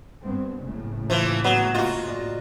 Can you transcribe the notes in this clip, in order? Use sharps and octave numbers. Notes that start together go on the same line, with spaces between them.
G2 B3 C4
F#1 A2 C#3
E3 F3
F#3 B3
F4 F#4 D#5 A#5
D5 D#5